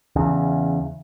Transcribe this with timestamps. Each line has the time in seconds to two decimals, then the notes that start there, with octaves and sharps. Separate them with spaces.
0.16 E2 C#3